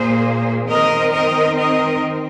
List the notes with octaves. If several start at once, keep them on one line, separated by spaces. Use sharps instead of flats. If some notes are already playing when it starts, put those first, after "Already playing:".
Already playing: A#2 A#3 G#4 C5
D#3 C4 A#4 D#5
A#4 D#5
A#4 D#5